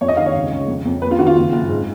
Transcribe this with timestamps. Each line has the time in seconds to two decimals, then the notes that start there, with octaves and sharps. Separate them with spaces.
0.01 F2 C#5
0.08 D#5
0.17 D#3 F5
0.26 C#5
0.35 C#2
0.52 C#2
0.68 F2
0.85 F2
1.02 A#3 B4
1.11 F4
1.19 D#3 F#4
1.27 F4
1.36 F#1
1.52 F#1
1.69 G#2